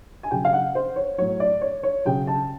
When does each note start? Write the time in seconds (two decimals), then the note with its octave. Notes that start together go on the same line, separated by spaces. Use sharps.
0.23 G#5
0.31 C#3 F#3 G5
0.45 F5
0.53 F#5
0.75 C5
0.96 C#5
1.18 A2 F#3 C#5
1.40 D5
1.61 C#5
1.83 C#5
2.05 C#3 F#3 G5
2.27 A5